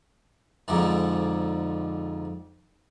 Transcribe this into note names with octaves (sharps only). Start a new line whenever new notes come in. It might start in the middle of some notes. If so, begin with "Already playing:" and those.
F2 G#2 D3